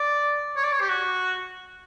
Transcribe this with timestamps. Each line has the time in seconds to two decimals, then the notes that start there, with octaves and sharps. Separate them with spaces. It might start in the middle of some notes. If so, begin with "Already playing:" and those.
Already playing: D5
0.56 C#5
0.63 D5
0.72 C#5
0.81 G4
0.89 F#4